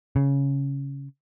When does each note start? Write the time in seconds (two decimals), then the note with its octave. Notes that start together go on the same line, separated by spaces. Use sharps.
0.16 C#3